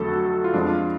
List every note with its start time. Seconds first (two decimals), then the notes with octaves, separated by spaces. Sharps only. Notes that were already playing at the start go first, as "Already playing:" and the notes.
Already playing: F2 D3 F#3 A3 A4
0.08 F#4
0.44 F4
0.54 F2 F3 G#3 D4
0.69 F4